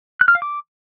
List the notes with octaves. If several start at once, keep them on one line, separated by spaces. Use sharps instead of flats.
F#6
F6
F5
D6